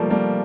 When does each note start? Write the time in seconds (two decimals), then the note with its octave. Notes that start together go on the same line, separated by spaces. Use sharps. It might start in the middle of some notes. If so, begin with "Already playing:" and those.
Already playing: F3 G3 A3 A#3
0.10 G3 A#3